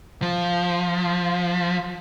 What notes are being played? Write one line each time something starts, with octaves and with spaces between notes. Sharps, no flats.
F3